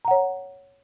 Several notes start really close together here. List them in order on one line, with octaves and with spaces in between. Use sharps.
A#5 F#5 C#5